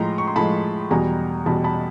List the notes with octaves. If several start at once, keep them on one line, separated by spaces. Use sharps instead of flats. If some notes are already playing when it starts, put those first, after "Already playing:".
Already playing: A2 F3 G#3 A#5 C6
C#6
C6
A2 F3 G#3 A5 B5
E2 B2 G3 G#5 A#5
E2 B2 G3 A5 B5
A5 B5